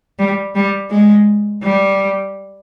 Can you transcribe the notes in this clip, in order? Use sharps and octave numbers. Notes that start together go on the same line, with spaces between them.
G3
G3
G#3
G3